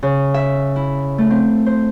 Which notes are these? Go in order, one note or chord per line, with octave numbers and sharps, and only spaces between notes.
C#3
E5
E4
A3
C4
C5